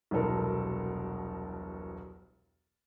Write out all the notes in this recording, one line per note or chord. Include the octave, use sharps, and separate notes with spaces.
E1 C2 B2 F#3 A4 A#4